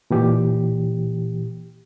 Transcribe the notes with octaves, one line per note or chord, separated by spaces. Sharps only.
A#2 E3 G4